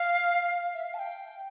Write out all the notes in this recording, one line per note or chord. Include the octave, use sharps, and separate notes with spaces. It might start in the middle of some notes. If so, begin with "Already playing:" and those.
Already playing: F5
E5
F5
A5
G5